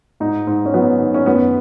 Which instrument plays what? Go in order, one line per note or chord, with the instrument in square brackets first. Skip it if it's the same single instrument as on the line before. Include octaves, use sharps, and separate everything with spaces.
[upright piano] G#2 D#4
G#2
C#4
F#3 B3
D#3
C#4
F#2 B3